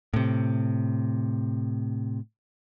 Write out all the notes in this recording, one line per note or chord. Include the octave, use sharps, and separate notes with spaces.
A2 C3